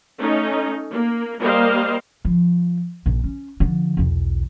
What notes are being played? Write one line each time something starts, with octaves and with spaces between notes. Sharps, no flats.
A3 C#4 D#4
A#3
G3 A#3 A#4 C5 D#5 F5
F3
A#1 D#4
C#4
D3 F3
B1 E2